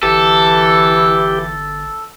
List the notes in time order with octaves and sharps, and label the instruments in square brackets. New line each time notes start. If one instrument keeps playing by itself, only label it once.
[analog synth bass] G1 [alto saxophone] E3 [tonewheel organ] G4 [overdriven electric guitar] A4